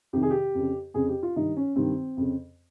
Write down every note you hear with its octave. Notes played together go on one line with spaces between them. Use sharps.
F2 C3 D#3 G4
G#4
G4
F2 C#3
F2 C#3 G#4
G4
F4
G2 D#3 D#4
C#4
G2 D#3 C4
F2 C#3